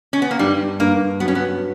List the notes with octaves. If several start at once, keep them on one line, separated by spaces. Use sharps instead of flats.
C#4
B3
A#3
G2 G3
G2 A#3
F#3 B3
C#4
B3